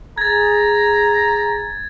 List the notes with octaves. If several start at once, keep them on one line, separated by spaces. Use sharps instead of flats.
G#4 A#5 G#6 A6